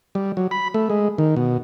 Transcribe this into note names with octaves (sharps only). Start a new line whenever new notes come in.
G3
F#3
B5
A3
G#3
D#3
B2